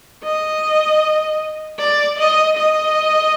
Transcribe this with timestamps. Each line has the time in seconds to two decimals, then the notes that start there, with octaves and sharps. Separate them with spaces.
0.24 D#5
1.80 D5
2.19 D#5
2.57 D#5